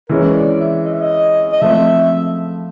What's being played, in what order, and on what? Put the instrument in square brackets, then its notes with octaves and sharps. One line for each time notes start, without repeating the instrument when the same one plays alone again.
[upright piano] E3 G#3 C#4 [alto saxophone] A#4
[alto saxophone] C#5
D5
E5
D#5
E5
D#5
D#5
[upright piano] F3 A3 C4 [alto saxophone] E5